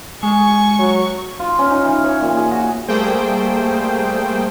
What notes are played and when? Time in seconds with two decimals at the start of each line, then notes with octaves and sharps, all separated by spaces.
0.23 G#3 G#5 C#6
0.79 F#3
1.39 F4
1.59 C#4
1.70 D#4
1.85 E3
2.04 C#5
2.21 A#2
2.37 G#4
2.51 F#4
2.88 G3 A3 A#3 G#4 C5 G5